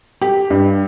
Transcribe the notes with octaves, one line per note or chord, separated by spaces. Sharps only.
G4
G2